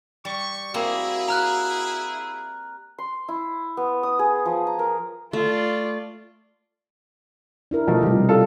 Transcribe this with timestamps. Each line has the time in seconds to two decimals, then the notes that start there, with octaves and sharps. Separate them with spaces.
0.25 G3 C#6
0.74 A#3 C4 E4 F#4 G#4
1.28 A#5 F6 F#6
2.98 C6
3.28 E4
3.77 B3
4.03 D#6
4.19 G#4
4.45 F3
4.67 A#5
4.79 A#4
5.33 A3 F4 D5
7.71 D4 E4 A#4
7.87 B2 F3 A3 D#5
8.03 C3 F3 G3 G4
8.29 F4 A4 F5